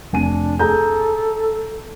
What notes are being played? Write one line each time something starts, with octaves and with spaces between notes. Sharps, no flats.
F1 D4 G#5 D#7
G#4 A4 A#5 G6